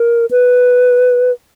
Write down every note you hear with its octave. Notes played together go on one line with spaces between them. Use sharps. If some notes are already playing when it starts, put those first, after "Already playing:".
Already playing: A#4
B4